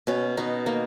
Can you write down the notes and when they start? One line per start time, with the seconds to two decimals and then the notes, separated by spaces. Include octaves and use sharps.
0.07 B2 C#4
0.37 B2 D#4
0.66 A#3 D#4